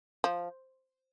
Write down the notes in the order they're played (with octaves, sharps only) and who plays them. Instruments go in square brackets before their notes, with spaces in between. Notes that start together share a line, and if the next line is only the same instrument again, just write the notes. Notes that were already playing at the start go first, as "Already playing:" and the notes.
[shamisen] F3